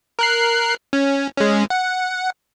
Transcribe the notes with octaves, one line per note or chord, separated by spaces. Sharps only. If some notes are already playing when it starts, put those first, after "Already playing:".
A#4 F#6 C7
C#4
G#3 C#4
F#5